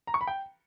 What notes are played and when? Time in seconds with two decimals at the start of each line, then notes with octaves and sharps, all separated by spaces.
0.07 A#5
0.14 C#6
0.21 B5
0.27 G5